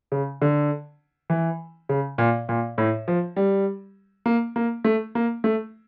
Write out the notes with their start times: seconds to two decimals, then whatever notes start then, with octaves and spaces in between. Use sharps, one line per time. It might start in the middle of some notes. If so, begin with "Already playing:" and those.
0.12 C#3
0.42 D3
1.30 E3
1.89 C#3
2.18 A#2
2.49 A#2
2.78 A2
3.08 F3
3.36 G3
4.26 A#3
4.56 A#3
4.84 A3
5.15 A#3
5.44 A3